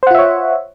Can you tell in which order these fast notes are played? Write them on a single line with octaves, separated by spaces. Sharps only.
C5 F#5 F4 E5 C#5